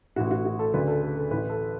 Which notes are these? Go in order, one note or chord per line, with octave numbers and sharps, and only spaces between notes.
A1 A2 F#4
F#4
F#4
A4
D2 C#3 B4
A4
A4
A4
A1 A2 B4
A4